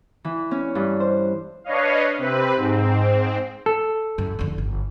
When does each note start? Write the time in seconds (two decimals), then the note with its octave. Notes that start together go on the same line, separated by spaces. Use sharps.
0.25 E3
0.51 C#4
0.75 G2
1.00 C5
1.64 D4 B4 C#5 D#5 F5
2.18 C3 C4 B4
2.56 G#2 C4
3.66 A4
4.18 F#2
4.39 F2 D3
4.58 G1